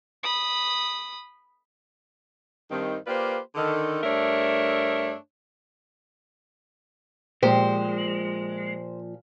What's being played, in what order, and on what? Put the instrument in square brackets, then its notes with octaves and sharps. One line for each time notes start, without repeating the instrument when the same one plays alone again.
[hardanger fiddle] B5 D#6
[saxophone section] G2 D#3 C4
A#3 F4 G4 B4 C5 D5
D3 D#3 A4
G2 A3 D4 A#4 C#5 E5
[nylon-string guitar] A#2 F3 [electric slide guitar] G#3 [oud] G4 [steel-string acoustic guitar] C5